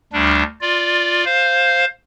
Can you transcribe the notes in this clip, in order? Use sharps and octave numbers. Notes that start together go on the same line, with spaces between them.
D2 G3 D4
F4 D5
C5 F5